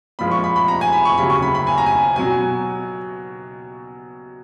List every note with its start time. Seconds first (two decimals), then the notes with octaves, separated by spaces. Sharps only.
0.19 A#2 F3 G#3 B5
0.31 C#6
0.44 B5
0.56 B5
0.68 A#5
0.81 G#5
0.93 B5
1.05 C#6
1.18 D#2 C#3 F#3 B5
1.30 C#6
1.42 B5
1.55 B5
1.67 G#5
1.78 A#5
1.86 G#5
2.16 B2 F#3 G#5